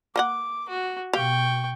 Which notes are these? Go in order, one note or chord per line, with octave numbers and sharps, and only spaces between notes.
A#3 D#5 F#5 D6
F#4
B2 G4 F5 G5 C#6